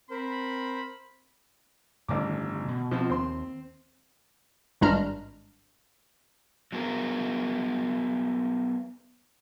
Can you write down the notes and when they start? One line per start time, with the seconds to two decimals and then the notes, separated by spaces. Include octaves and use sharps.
0.10 C4 A#4 C5 B5
2.08 A1 G2 D3 D#3 D6
2.68 B2
2.91 B2 F3 C4
3.10 D#2 C4 C6
4.81 G#1 G2 G#3 D4 A#5 F6
6.72 F#3 B3 G#4 A#4